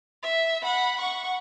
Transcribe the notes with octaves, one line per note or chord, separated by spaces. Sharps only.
E5
F#5 B5
F#5 C#6